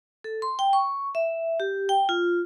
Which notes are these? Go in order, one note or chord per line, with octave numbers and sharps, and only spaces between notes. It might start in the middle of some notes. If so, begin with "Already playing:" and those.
A4
C6
G5
C#6
E5
G4
G5
F4